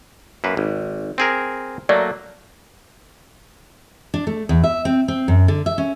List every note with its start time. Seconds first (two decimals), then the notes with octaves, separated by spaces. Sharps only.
0.44 F#2 A#3 B4
0.57 G#1
1.18 C4 G#4 A#4
1.89 F#3 A3 A#3 D5
4.14 D4
4.27 A3
4.49 E2
4.64 E5
4.85 C4
5.08 C4
5.28 F#2
5.48 D3
5.66 E5
5.78 C#4